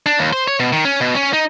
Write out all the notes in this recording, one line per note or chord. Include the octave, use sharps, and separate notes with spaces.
D4
D#2
C5
C#5
B2
D#3
C#4
B2
C#4
D#4